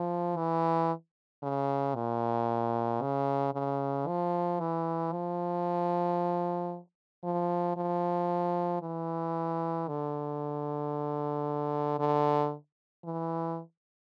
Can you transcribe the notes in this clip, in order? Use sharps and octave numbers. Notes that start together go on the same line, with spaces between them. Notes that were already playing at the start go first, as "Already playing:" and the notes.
Already playing: F3
E3
C#3
A#2
C#3
C#3
F3
E3
F3
F3
F3
E3
D3
D3
E3